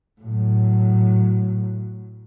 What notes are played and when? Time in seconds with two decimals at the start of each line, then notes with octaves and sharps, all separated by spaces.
0.21 A2 F#3